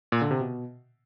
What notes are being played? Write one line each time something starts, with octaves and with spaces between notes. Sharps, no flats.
A#2
D3
C3
B2